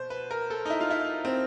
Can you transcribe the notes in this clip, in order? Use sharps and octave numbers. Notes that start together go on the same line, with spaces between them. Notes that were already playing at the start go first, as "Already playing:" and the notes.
Already playing: B2 C5
B4
A#4
A4
D#4
E4
F4
E4
C4